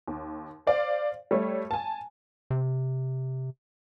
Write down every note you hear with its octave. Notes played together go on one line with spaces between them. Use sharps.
D#2
C5 D5 F5
G3 A3 C#5
G#5 A5
C3